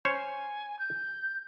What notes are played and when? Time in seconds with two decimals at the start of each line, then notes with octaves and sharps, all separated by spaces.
0.05 C#4 C5 C#5 G#5
0.79 G6